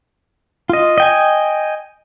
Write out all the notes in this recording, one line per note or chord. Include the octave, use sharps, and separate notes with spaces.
F4 D#5
D#5 G5 G#5